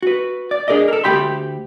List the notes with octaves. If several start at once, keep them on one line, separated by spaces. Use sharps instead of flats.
F#4 B4
D5
D4 G#4 A#4 D5 D#5
A4 A#4
D2 D#3 G4 G5 B5 C6